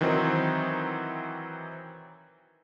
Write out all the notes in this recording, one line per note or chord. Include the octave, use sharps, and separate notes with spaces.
D#3 E3 F#3 C4 D#4